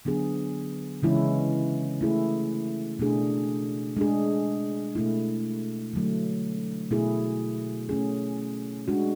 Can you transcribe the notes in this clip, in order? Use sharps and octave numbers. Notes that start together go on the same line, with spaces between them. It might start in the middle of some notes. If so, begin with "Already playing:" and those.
D3 F#3 B3 D4 G#4
C#3 E3 G#3 C#4 E4
A3 E4 G#4
B2 A3 D4 G#4
G#3 D4 G#4
B2 A3 E4
D3 F#3 A3
B2 A3 E4 G#4
A3 C#4 G#4
G#3 D4 F#4